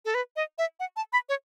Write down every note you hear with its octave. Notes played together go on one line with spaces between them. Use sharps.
A4
B4
D#5
E5
F#5
A5
B5
C#5